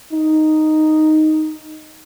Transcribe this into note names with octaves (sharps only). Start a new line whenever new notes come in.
D#4